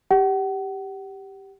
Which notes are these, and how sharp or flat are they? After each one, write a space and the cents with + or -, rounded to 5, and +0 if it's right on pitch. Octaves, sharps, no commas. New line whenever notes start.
G4 +0 F#5 +35